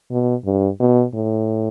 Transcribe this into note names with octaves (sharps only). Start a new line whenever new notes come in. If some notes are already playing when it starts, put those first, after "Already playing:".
B2
G2
B2
A2